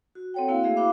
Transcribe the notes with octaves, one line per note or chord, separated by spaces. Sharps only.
F#4
C4 A4 C#5 F#5 G5
A#3 E4 F#4 F5
A3 G#4 E5 F5
E4 F#4 C5 F5 B5 D6